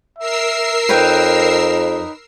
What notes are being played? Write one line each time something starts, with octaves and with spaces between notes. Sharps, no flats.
A#4 E5 E6 C7
F2 D#4 B4 C#5 G5